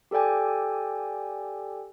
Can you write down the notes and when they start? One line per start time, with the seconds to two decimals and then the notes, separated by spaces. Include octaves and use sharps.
0.11 G4 A4 D5 G5 G#5